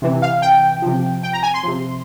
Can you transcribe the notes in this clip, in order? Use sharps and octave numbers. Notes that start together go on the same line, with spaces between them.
C3 E3
F5
G5
C3 F3
G5
A#5
G#5
C6
C3 F3